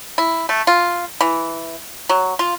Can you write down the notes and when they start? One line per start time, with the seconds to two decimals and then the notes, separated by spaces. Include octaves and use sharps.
0.18 E4
0.49 A3
0.67 F4
1.21 E3
2.09 F#3
2.39 F4